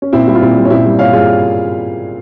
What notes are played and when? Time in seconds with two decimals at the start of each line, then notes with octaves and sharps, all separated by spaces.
0.02 C#4
0.13 A#2 C4 E4
0.27 G3 E4
0.35 F4
0.42 A#2 C4 E4
0.57 G3
0.65 C#4
0.70 A#2 C4 E4
0.86 G3
0.99 A#2 C#5 F5
1.13 G3 F4 G#4